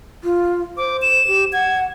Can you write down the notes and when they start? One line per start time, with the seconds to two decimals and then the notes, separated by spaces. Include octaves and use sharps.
0.24 F4
0.77 C5 D6
1.02 E7
1.27 G4
1.53 F#5 G#6